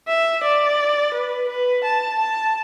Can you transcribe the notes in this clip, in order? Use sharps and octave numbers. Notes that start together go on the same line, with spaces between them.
E5
D5
B4
B4
A5
A5